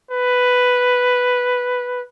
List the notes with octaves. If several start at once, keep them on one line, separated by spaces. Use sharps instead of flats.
B4